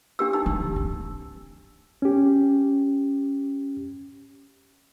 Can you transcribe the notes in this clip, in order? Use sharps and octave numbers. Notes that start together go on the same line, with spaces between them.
D4 G4 E6
D#4 E6
D3 E3
C4
C#4 G4